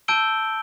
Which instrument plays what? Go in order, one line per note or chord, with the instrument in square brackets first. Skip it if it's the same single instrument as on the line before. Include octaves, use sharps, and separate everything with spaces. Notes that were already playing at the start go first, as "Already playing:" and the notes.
[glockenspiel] A5 E6 G6 D7 G7